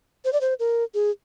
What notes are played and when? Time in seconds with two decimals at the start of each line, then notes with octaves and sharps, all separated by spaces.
0.25 C5
0.33 D5
0.41 C5
0.59 A#4
0.94 G#4